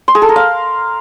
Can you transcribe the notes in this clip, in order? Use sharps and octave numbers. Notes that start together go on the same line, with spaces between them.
C6
G#4
A4
A#4
F5